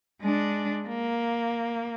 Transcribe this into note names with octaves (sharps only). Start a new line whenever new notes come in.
G#3 D4
A#3